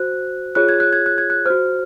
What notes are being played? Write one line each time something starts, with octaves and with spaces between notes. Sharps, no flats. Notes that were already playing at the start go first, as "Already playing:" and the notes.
Already playing: F#4 C5 F#6
F4 G#4 C#5 F#6
G#6
F#6
G#6
F#6
G#6
F#6
F#4 C5 F6